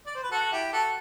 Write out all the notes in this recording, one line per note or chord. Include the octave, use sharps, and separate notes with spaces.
D5
C5
B4
F#4 A4
E4 G4
F#4 A4